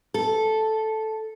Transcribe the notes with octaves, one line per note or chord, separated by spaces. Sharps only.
A4